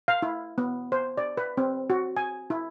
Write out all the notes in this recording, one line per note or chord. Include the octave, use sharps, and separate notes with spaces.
F5
E4
B3
C5
D5
B4
C4
F#4
G#5
E4